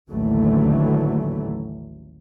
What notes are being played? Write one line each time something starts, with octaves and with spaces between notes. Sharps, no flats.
A1 D#2 D3 E3 F#3 A3